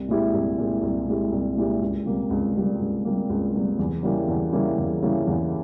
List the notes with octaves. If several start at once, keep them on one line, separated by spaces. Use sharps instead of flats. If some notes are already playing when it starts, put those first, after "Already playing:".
Already playing: C2
A#2 G#3 E4 G4
C2
A#2 G#3 E4 G4
C2
A#2 G#3 E4 G4
C2
A#2 G#3 E4 G4
C#2
C3 G3 A#3
C#2
C3 G3 A#3
C#2
C3 G3 A#3
C#2
C3 G3 A#3
E2
C#3 G3 A#3 E4
E2
C#3 G3 A#3 E4
E2
C#3 G3 A#3 E4
E2